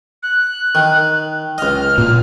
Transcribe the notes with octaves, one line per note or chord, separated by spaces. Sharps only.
F#6
D#3
C#2 D#5 F6
A#2